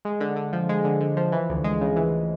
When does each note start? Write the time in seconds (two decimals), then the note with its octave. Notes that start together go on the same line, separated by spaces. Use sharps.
0.05 G#3
0.20 D3
0.36 D3
0.53 F3
0.69 G#3
0.84 D3
1.01 D3
1.17 F3
1.32 E3
1.49 D2
1.64 G#3
1.81 C#3
1.96 E3